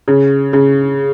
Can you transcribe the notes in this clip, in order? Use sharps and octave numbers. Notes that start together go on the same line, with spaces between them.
C#3
C#3